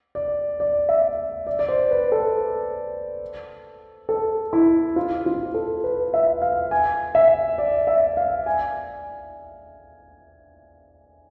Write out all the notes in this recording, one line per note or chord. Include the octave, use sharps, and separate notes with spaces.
D5
D5
E5
D5
D5
C5
B4
A4
A4
E4
F4
F4
A4
B4
E5
F5
G#5
E5
D5
E5
F5
G#5